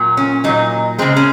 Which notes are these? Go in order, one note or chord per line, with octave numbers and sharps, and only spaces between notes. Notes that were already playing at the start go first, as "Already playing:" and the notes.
Already playing: A#2 F#3
C#4
A#2 F#3 D#4
C#3 G#3 C4
C#4